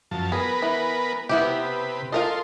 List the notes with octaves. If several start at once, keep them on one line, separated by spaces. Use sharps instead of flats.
F#2 F3 A5
B3 G#4 A#4 B4
E3
C3 B3 E4 G4 B4
F4 A4 A#4 D#5 C6